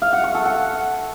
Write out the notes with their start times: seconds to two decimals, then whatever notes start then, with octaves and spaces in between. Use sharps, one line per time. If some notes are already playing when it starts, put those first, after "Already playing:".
0.02 F5
0.13 F#5
0.24 C#6
0.35 A4
0.46 F#5